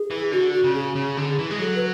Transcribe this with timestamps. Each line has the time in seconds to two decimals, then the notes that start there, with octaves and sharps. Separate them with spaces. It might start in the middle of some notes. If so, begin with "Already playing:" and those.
Already playing: G#4
0.11 E3
0.32 D3 F#4
0.53 F#4
0.64 C#3
0.74 G#4
0.96 C#3
1.17 D3
1.39 E3
1.51 G#3
1.59 F#3 A4
1.76 B4